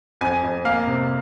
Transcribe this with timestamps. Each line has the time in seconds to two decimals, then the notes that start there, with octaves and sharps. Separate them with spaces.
0.21 F2 G#5
0.43 F2
0.65 A#3 F5
0.87 C3